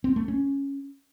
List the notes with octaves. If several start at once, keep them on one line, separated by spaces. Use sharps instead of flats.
C4
A3
C#4